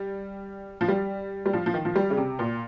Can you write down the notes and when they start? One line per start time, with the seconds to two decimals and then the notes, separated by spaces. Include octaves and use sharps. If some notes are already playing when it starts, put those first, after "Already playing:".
Already playing: G3
0.81 F3
0.88 G3
1.46 G3
1.53 F3
1.66 F3
1.74 D#3
1.85 F3
1.96 G3
2.10 C#3
2.17 C3
2.39 A#2